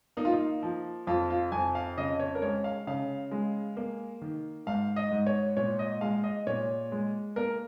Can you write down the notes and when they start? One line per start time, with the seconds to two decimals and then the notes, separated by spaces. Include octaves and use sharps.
0.17 A#3 D#4
0.25 F4
0.33 D#4
0.63 F3
1.07 F2 F4
1.30 F4
1.52 F2 G#5
1.75 F5
1.97 C#3 D#5
2.20 C#5
2.35 A#4
2.42 G#3 C#5
2.64 F5
2.87 C#3 F5
3.31 G#3
3.77 A#3
4.22 D#3
4.67 G#2 F5
4.96 D#5
5.11 G#2
5.27 C#5
5.57 A#2 C#5
5.79 D#5
6.01 G#3 F5
6.24 D#5
6.47 A#2 C#5
6.92 G#3
7.36 A#3 A#4